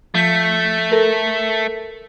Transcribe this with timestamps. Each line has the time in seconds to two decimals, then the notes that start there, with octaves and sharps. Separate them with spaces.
0.15 F3 A3 G6 B6
0.92 A4 A#4